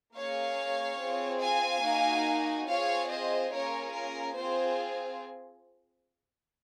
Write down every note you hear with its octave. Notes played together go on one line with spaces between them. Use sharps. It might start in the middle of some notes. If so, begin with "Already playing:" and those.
A#3 C#4 G#4 C#5 F5
C4 F4 G#4
F5 G#5
A#3 D#4 F#4
C4 F4 G#4 C#5 F5
C5 D#5
A#3 C#4 F4 G#4 A#4 C#5
A#4
C4 F4 G#4 C5